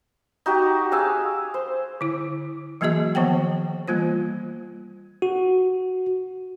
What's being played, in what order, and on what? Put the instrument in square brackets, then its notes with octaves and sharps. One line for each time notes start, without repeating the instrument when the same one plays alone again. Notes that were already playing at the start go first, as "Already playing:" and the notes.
[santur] D#4 F#4 G4
G#4 F5 D6 E6
C5
[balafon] D3 E4
E3 F#3 A#3 F#4 G#4 D#5
D#3 F3 B3 C5 F#5 G5
E3 G3 A#3 F4 C5
[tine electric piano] F#4